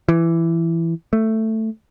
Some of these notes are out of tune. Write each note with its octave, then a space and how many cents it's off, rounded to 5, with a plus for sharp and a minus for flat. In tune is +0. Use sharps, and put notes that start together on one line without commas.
E3 +10
A3 +10